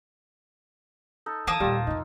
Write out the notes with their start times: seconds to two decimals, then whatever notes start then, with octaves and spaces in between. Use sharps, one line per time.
1.26 D#4 A4
1.47 E3 A#3 A5 D#6
1.60 D#2 A#2 G3 F4
1.87 F2 C3 D#4